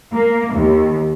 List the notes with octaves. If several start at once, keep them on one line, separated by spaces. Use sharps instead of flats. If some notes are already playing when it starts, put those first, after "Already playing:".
A#3
D#2